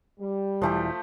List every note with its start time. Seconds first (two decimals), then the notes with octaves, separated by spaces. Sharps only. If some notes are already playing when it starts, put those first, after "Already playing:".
0.19 G3
0.62 E1 E3 F3 A3 G4